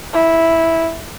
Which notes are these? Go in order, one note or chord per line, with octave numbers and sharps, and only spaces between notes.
E4